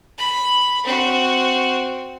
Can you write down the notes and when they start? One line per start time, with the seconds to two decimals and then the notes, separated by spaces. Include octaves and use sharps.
0.18 B5
0.84 C4 F#4